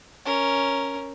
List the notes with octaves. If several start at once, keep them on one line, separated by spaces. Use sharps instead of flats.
C#4 A#4